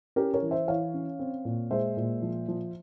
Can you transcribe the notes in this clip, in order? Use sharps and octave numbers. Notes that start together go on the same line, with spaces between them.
C#4 G4 A#4
A#4 C#5
E3
C5 E5
E3 C#5 F5
C#4
C4
A#2
G#3 C5 E5
A#2
F3
F3